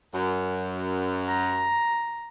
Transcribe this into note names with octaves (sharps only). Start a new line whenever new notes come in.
F#2
A#5